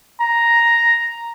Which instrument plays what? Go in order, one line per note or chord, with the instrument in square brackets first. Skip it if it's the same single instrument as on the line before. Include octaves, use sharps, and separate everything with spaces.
[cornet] A#5